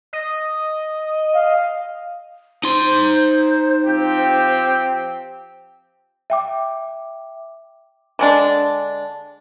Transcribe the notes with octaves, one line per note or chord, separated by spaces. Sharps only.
D#5
F5
D#4 C5 C6
F3 C4 G4
E5 G5 D6
D3 G#3 D4